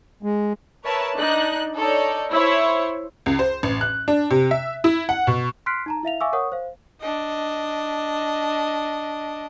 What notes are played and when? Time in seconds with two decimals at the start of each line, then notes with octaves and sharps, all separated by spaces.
0.23 G#3
0.85 A#4 B4 C#5 E5 A5
1.15 D4 D#4 F#6
1.77 D#4 A4 C#5 D5
2.30 E4 C5 C#5
3.26 C#2
3.39 C5
3.63 A1
3.81 F#6
4.08 D4
4.31 C3
4.51 E5
4.84 E4
5.09 F#5
5.27 B2
5.66 C6 F6 F#6 B6 C7 D7
5.86 D#4 A5 A#5
6.03 E4 E5 F5 F7
6.21 E5 F5 G#5 C#6 D6 E6
6.33 A#4 C#5 F#5 C#6 D#6
6.52 C5 F5
7.01 D4 D#5